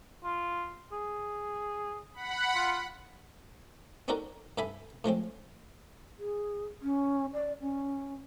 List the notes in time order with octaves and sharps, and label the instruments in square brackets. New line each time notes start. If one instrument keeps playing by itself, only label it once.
[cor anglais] F4
G#4
[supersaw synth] F#5 B5
[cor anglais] F4
[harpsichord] C4 D4 D#4 F#4 A4 A#4
G2 A4 E5 G#5 B5
A2 F3 G#3 C4
[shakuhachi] G#4
C#4
D5
C#4